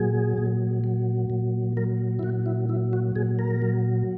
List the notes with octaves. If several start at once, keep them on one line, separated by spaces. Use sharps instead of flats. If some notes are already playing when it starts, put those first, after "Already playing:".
Already playing: A#2 F#3 G#4
A#2
F#3
A#2
F#3 A#4
E4
A#2 F#4
E4
F#3 E4
F#4
A#2 G#4
A#4
F#3